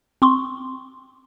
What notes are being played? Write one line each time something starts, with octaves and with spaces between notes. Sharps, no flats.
C4 C6 C#6